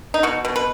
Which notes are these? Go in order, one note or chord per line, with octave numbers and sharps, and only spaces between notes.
D#4
B2 F#4
B2
B4